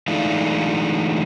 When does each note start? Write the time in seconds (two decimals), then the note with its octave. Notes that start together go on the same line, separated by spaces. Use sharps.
0.08 E3 G#3 A3 D4 D#4 F4